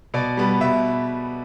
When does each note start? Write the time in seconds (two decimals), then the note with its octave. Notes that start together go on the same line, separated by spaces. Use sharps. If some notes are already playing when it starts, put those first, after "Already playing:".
0.14 B2 D5
0.37 G3 B3
0.60 B2 E5